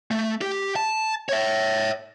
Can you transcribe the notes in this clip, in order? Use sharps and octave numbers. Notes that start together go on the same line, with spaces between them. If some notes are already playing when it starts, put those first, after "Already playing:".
A3
G4
A5
C#5 E5